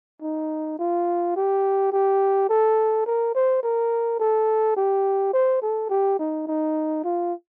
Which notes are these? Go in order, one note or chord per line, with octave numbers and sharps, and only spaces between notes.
D#4
F4
G4
G4
A4
A#4
C5
A#4
A4
G4
C5
A4
G4
D#4
D#4
F4